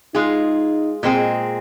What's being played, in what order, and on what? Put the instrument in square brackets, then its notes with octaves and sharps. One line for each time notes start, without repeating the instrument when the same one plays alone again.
[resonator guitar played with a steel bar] G#3 F4 G#4 [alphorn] D#4
[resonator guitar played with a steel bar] A#2 G#3 C4 G#4